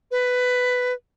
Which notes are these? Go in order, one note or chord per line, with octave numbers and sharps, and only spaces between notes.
B4